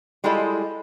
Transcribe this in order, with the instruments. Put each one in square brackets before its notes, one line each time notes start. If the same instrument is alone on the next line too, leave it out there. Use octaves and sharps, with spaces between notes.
[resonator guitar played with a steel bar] G3 G#3 E4 F4 A4 D#5